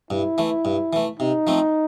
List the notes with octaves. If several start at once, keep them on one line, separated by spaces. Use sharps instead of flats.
G2 E4
E3 A3
G2
E3 A3
C3 D#4
F3 A3 C4